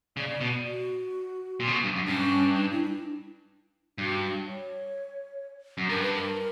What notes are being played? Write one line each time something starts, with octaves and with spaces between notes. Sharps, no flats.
C#3 D5
B2
F#4
A#2
C#3
B2
G2
F#2
G2 C#4
D4
E4
E4
D4
G2 F#4
C#5
F#2
G2 A#4
B4
A#4